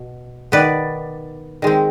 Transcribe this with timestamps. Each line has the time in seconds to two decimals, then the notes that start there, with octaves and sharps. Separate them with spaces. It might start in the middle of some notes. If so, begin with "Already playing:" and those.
Already playing: B2
0.52 D#3 B3 B4 D5
1.62 D#3 G#3 C4